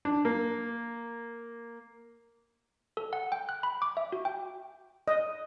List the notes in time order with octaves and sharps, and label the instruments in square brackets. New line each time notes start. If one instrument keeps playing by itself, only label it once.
[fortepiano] D4
A#3
[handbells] A4
F#5
G5
F#6
B5
D6
E5
F#4
G5
[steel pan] D#5